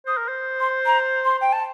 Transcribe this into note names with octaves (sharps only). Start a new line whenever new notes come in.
C5 D#6
A#4
C5
C6
A#5
C6
G5
A5